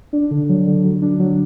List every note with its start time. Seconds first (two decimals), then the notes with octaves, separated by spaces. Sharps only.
0.13 D4
0.31 D3
0.49 F#3
0.67 D3
0.84 F#3
1.02 D4
1.20 F#3